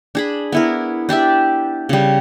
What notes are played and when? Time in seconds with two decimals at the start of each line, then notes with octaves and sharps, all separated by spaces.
0.15 D4 G#4 B5
0.52 B3 E4 A#4
1.09 D4 G4 D5 E5
1.89 C#3 G3